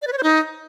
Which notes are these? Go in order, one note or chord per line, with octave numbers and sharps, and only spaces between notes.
D5
B4
C#5
C5
D#4